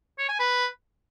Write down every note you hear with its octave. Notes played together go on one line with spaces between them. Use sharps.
C#5
G#5
B4